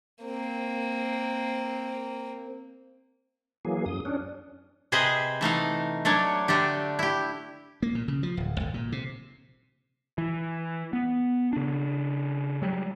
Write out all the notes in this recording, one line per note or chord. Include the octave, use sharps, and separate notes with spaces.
A#3 C4
E3 F#3 A#3 G#4
F#2 D#6
C#4 D4
C3 G#4 B4 C5 D#5
E3 A3 D#4 F5
F#3 A3 D4 C#5
D3 A3 D4 G4
E4 G4
A#3
A#2
C#3
F3
D1
G1
A#2
C3
E3
B3
C#3 D4
F#3 G3